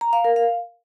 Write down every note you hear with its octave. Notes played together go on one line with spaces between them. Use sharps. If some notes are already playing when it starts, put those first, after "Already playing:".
A#5
F5
A#4
F5